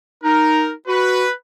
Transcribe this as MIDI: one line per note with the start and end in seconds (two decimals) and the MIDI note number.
0.24 0.72 63
0.24 0.71 70
0.88 1.26 66
0.88 1.33 71